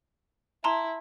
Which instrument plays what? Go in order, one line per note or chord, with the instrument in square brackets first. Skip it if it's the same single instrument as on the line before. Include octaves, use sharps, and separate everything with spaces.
[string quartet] E4 [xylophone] A5 A#5 C6